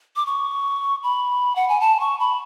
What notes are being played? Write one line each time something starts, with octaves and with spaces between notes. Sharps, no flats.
D6
C#6
B5
F#5
G#5
A5
C#6
B5